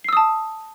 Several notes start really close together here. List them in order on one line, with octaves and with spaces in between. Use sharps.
C7 E6 D#6 A5